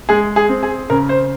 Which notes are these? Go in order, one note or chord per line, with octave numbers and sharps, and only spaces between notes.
G#3 G#4
G#4
C4
G#4
C#3 A#4
C5